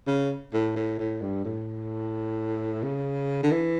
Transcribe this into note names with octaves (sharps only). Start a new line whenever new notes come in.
C#3
A2
A2
A2
G2
A2
C#3
D3
E3